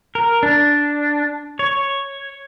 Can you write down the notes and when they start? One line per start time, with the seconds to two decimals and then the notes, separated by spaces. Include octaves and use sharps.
0.15 A#4
0.43 D4
1.59 C#5